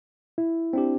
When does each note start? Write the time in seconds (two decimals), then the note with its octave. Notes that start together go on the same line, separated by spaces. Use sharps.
0.38 E4
0.73 C4 D4 G4